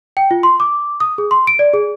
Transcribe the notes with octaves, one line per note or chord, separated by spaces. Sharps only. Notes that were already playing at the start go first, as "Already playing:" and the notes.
G5
F4
C6
D6
D#6
G#4
C6
D7
D5
G#4